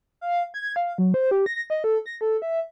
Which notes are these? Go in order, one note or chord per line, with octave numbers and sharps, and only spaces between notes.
F5
G#6
F5
F#3
C5
G4
A#6
D#5
A4
A#6
A4
E5